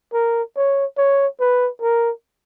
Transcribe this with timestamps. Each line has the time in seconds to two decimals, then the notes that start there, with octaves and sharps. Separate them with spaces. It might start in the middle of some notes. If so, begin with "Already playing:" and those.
0.13 A#4
0.56 C#5
0.97 C#5
1.40 B4
1.82 A#4